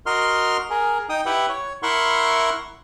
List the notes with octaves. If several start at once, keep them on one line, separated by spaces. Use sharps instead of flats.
F#4 A#4 D#5 C6 F6
G#4 A#4
D#4 G5 D#6
E4 G4 B4 E5 F#5
C#5
E4 A#4 E5 F#5 C6 C#6